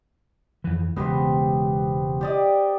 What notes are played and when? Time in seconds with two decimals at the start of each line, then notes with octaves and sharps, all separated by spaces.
0.64 F2 E3
0.96 E1 C#3 G#3 B3 G4 C5
2.21 G4 D5 D#5